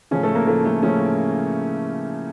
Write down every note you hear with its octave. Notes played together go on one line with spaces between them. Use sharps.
A2 C#3 F3 C#4
A3 A4
A#3 A#4
A2 F3 A3 A4
A3 A4
A2 C#3 F3 C#4